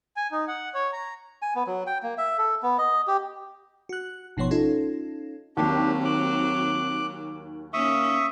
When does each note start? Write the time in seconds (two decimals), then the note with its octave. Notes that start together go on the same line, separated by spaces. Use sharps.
0.17 G#5
0.32 D#4
0.48 F#5
0.75 C#5
0.93 A#5
1.42 G#5
1.55 B3
1.67 F#3
1.87 G5
2.03 A#3
2.18 E5
2.38 A4
2.62 B3
2.78 D#5
3.07 G4
3.89 F#4 F#6
4.37 G#1 B2 F3 B3 C#5 C6
4.51 C#4 D#4 F4 A4
5.57 D#2 F#3 C4 D4 G4
6.05 D6 F#6
7.74 A#3 C#4 E5 C#6 D#6